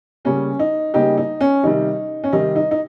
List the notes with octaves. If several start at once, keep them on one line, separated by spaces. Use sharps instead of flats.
C#3 G3 A#3 C#4
D#4
C#3 G3 A#3 D#4 G4
D#4
C#4
C3 D#3 G3 D#4
C#4
C3 D#3 G3 D#4
D#4
D#4